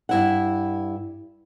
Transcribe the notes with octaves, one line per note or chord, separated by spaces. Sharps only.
G2 E4 F#5